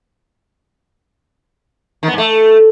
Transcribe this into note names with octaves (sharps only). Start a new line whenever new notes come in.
D#3
B3
G#2
A3